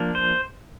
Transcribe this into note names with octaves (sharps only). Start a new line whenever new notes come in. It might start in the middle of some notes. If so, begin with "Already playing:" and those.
Already playing: F3 A#3 D4
C5